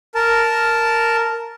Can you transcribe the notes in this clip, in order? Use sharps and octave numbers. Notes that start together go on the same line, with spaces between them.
A#4 A5